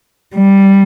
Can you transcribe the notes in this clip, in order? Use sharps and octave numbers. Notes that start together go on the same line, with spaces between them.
G3